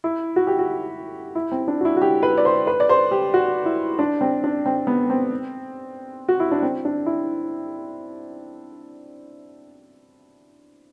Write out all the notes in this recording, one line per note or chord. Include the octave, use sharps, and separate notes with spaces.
E4
F#4
G4
F#4
E4
C4
D4
F#4
E4
F#4
G4
B4
D5
C5
B4
D5
C5
G4
F#4
E4
D4
C4
D4
C4
B3
C4
F#4
E4
D4
C4
D4
E4